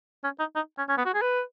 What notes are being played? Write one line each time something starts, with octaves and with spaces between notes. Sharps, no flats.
C#4
D#4
D#4
C#4
C#4
B3
F#4
G#4
B4